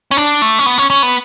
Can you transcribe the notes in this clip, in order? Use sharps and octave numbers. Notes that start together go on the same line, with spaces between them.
C#4
D4
A3
C#4
B3
C#4
C#4
B3